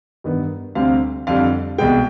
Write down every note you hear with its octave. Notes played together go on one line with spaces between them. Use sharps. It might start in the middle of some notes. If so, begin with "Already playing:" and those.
G2 D#3 B3
D2 C3 G3 C4 F5
F2 D3 G3 F5
C2 B2 G#3 G5